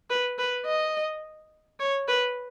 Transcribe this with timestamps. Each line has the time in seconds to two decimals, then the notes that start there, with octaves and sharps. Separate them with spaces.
0.10 B4
0.39 B4
0.66 D#5
1.80 C#5
2.08 B4